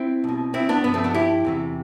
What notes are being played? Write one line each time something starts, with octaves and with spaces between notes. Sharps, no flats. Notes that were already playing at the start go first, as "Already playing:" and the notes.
Already playing: C4 E4
B1 B2
C4 E4
B3 D4
G2 F3 B3
A3 C4
B3 D4
E4 G4
E2 C3 E3